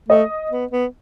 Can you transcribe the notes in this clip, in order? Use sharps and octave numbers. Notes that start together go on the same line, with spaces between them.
A3 D#5
B3
B3